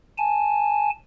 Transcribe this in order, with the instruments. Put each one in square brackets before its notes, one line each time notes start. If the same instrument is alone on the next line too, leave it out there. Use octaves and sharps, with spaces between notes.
[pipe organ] G#5 A5